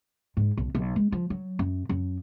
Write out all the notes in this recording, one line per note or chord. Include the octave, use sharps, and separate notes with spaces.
G#2
B1
B1
G#3
F3
F#3
F#2
F#2